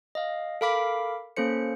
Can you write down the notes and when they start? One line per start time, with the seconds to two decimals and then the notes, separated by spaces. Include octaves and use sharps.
0.15 D#5 F5
0.61 A4 A#4 F5 B5 D6 B6
1.37 A#3 C#4 A4 C5 C#7